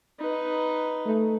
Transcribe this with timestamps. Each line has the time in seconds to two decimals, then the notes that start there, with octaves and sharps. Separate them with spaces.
0.20 D#4 B4
1.05 A3